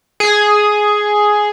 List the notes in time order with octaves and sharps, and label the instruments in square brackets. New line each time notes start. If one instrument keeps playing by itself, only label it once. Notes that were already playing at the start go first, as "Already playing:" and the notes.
[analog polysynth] G#4